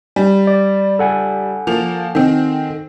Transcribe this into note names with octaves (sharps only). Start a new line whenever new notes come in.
G3
D5
A4 F#5 G#5
F3 A#3 F7
D#3 C4